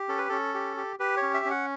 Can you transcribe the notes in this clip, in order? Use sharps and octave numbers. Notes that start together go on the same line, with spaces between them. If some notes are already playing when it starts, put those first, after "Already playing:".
Already playing: G4
C#4 A4
B4
C#4 A4
G4
G4
G4 B4
C#5
C#4
E5
C#4
F#5